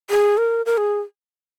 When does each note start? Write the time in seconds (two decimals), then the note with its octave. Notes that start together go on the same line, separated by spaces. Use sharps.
0.10 G#4
0.38 A#4
0.66 A#4
0.77 G#4